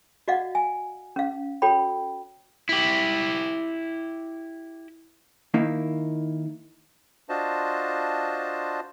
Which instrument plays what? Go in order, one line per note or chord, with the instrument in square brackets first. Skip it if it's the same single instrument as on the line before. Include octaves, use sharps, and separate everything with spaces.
[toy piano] F#4 D5 D#5 F5 F#5
G#5
C#4 F5
F#4 A4 C#5 G5 B5
[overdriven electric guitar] E4 G4
[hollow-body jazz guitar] D#3 A#3 D#4 E4
[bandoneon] D4 F4 F#4 C5 D#5 A5